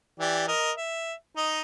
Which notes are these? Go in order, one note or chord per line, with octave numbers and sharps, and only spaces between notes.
E3 G4 D5
A#4 D#5
E5
D#4 D#5